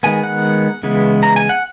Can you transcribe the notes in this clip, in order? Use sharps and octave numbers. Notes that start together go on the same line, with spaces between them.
D#3 G#3 B3 G#5
F#5
C#3 E3 G#3 B3
A#5
G#5
F#5